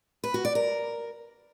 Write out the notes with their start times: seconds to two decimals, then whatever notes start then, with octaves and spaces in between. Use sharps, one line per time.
0.24 B4
0.34 F#4
0.45 D5
0.55 A#4